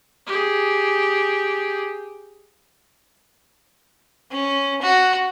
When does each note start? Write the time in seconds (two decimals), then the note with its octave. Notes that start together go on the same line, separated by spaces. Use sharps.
0.27 G4 G#4
4.31 C#4
4.82 F#4